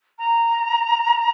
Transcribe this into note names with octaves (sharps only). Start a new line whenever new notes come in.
A#5